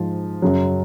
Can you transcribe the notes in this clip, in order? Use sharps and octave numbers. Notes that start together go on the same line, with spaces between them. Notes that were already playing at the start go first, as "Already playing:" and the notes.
Already playing: G#2 F3
F#2 C#3 F#3